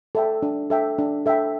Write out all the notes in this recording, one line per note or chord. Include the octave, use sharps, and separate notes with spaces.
A4 E5 G5
D4
A4 E5 G5
D4
A4 E5 G5